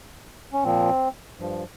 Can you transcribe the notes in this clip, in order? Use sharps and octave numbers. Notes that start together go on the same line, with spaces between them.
C#4
A#2 F3 C4
G2 F3